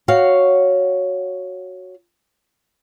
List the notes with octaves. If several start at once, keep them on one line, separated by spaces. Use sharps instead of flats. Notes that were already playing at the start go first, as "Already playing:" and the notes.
F#4 C#5 F5